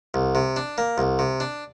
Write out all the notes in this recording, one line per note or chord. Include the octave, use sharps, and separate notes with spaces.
C2
C3
D4
A#3
C2
C3
D4